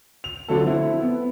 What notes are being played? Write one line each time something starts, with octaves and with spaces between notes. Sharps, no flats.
F7
D3 F3 F#3 A3 A4
C4 E4
B3